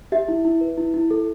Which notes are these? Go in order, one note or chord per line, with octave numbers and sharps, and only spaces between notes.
G4 E5
E4
E4
B4
E4
E4
A4